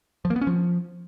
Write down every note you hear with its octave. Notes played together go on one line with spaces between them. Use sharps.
F3
A#3
B3
C#4
F3